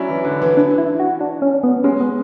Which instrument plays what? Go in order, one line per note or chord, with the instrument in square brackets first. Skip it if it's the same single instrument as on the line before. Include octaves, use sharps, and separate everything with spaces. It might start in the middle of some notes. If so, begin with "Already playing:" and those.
Already playing: [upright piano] F#3 C#4 D4 E4
E3
D3
E3
[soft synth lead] D4
E4
F#4
D4
C#4
B3
[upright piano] G#3 [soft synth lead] C#4
[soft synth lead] B3